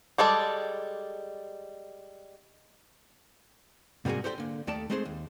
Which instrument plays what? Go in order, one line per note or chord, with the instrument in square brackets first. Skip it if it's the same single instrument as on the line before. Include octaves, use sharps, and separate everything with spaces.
[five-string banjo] G3 G#3 A4 D5
[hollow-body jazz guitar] G#2 C3 G3 A#3 F#4 G#4
G4 A4 C5 D5 D#5 G5
D3 A#3
D#2 D#3 A3 A4 D5 A5
G#3 A3 C4 D#4 G#4 C5
D#2